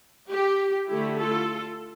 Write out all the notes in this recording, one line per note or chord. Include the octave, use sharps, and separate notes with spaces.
G4
D3 A3 E4 G4
F4 A4